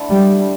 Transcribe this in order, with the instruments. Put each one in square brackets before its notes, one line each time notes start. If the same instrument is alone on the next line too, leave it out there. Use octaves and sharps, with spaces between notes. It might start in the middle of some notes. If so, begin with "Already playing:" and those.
Already playing: [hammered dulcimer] D3 A3 E4 A4
[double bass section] G3
[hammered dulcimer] G3 D4